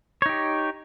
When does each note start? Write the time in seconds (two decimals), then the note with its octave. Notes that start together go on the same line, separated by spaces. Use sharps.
0.22 C#5
0.26 D#4
0.29 G4